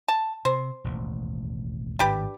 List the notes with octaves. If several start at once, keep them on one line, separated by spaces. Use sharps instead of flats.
A5
C3 C5
E1 A1 D#2
G#1 A2 D4 G4 B4